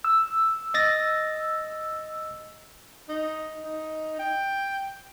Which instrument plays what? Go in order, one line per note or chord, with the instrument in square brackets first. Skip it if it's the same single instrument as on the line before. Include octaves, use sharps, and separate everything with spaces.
[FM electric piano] E6
[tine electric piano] D#5 A6 A#6
[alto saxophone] D#4
D#4
G5